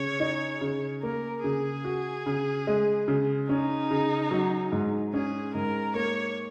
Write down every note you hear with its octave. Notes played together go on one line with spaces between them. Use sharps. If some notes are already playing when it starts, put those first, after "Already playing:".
Already playing: C#3 C#5
D#4
C#3
A#3 A#4
C#3 G#4
F#4
C#3
G#3
C#3
C#4 D#4
C#3
F#3
G#2
C#4 G#4
G#2 A#4
A#3 C#5